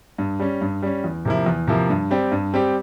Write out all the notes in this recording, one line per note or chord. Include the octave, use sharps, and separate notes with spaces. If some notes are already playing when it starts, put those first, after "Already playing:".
G2
G3 C#4
G2
G3 C#4
E2
C3 F3 A#3 E4
E2
C3 F3 A#3 E4
G2
G3 C4 G4
G2
G3 C4 G4